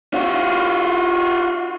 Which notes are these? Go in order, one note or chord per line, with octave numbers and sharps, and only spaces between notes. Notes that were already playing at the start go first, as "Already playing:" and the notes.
F4 F#4